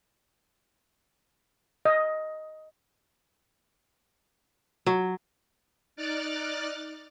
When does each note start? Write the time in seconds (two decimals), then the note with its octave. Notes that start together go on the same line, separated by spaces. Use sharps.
1.85 D#5
4.86 F#3
5.96 D#4 D5 D6 F6 F#6 A6